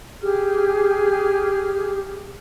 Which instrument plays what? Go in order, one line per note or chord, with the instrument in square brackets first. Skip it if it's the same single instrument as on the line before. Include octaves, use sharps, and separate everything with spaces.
[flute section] G4 G#4 F6